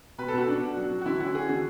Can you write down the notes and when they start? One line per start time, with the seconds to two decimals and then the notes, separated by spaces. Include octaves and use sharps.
0.18 B2 B4
0.28 A4
0.34 B2 F#4
0.48 D4
0.62 B2
0.77 F#3
0.91 F#3
1.01 F#4
1.06 D3 E4
1.20 C#4 F#4
1.35 C#4 G#4
1.49 D3 F#4